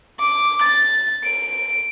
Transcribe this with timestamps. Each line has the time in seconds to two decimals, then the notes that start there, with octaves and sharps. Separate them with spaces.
0.19 D6
0.62 A6
1.24 D7